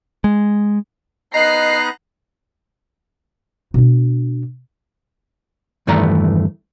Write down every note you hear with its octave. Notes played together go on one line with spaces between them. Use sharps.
G#3
B3 D#4 B4 D#5 A#5 F#6 C7
B2 D4
E2 G2 D#3 E3 A3 A#5